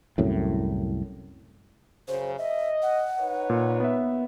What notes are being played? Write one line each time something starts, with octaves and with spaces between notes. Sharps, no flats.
C2 F#2 A2
F#2 C#3 C5
D#5 E5
F#5
D#4 B4 C#5
A#2
B3 E5